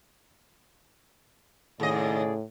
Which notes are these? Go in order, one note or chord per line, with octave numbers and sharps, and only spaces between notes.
D#2 A2 C#3 G#4 D5 D#5